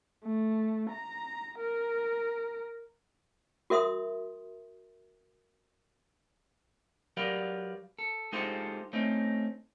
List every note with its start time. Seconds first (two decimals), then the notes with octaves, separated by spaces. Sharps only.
0.24 A3
0.90 A#5
1.59 A#4
3.70 F#4 A#4 E5 C6 D#6
7.17 F#3 G4 A#4 B4 D5 F5
7.99 A4
8.32 G#3 D#4 F4 G4 A4 C5
8.93 A3 C4 C#4 D#4